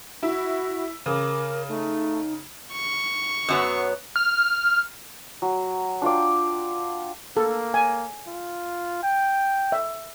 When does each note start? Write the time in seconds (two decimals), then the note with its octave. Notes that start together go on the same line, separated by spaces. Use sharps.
0.23 E4 F#4
1.06 C#3 A#4 D6
1.68 A3 D#4
2.73 C#6
3.49 F#2 F#3 B3
4.16 F6
5.42 F#3
6.02 D4 F4 G5 D6
7.37 A#3 A4
7.74 G#5
8.27 F4
9.03 G5
9.72 E5